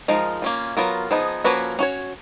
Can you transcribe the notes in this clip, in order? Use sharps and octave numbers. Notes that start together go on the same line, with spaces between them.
F3 G#3 D#4 A#4
A#3 C#4 F4
F#3 B3 F4 A#4
F3 B3 D#4 G#4
F3 A#3 C#4 F#4 B4
C#4 F#4 C#5